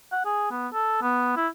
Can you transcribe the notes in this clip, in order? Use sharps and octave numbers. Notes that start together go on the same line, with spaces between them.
F#5
G#4
B3
A4
B3
E4